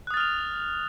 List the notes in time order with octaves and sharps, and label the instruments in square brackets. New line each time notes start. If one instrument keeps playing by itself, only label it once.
[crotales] F#6
D#6
A6
F6
F7